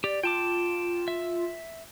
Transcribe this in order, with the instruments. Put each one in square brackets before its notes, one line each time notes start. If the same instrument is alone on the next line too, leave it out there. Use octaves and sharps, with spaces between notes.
[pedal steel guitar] G4 [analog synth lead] D5
[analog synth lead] F4 [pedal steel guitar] G5 A5 D6
[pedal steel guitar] E5